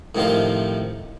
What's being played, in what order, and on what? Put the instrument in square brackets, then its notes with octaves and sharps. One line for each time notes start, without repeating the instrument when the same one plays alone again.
[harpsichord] A2 C3 D#3 F3 F4